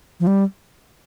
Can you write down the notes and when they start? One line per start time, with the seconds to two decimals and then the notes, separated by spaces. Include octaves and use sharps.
0.20 F3
0.27 G3